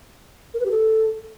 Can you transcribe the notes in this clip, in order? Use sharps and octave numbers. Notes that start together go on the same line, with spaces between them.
A#4
B4
G4
A4